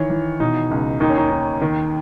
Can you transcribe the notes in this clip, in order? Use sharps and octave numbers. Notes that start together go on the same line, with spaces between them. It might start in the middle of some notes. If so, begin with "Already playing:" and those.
Already playing: D#3 E3 C#5
E3
B2 D#4
C#2
D#2 D#4
C#4
D#4
D#2
D#3